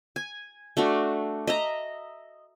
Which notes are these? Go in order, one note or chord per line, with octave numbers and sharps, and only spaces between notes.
G#5
A3 D4 F#4
D#5 E5 A#5